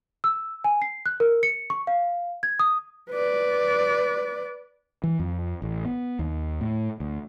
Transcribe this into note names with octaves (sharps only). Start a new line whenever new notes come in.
E6
G#5
C7
F#6
A#4
C#7
C#6
F5
G#6
D#6
B4 D5
E3
F2
A1
B3
D#2
A2
D2